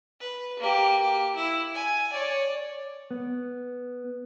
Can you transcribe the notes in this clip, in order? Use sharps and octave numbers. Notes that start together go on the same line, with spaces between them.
B4
A#3 G4
G4
E4
G#5
C#5 D5
B3